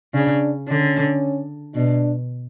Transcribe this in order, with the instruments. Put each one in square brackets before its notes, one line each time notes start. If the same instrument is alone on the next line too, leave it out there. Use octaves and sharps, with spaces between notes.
[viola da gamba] C#3 [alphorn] D4
[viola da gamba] D3 [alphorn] C#4
[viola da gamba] B2 [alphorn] D4